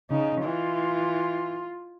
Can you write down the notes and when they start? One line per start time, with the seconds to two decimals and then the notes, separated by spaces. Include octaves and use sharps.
0.10 C#3 D#4
0.43 E3 F4